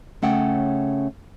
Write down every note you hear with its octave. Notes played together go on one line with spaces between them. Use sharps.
C#3 A3 C#4 F#5 G5